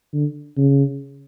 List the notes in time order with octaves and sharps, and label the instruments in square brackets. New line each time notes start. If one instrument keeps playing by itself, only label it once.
[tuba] D3
C#3